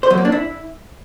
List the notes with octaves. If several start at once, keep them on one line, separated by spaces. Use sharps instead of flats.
C5
F#3
A#3
D4
E4